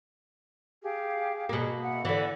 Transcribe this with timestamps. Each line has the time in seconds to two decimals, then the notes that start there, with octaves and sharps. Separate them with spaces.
0.83 G4 G#4 F5
1.49 B2 A#3 G#4
1.83 E4 F#5
2.05 D3 E3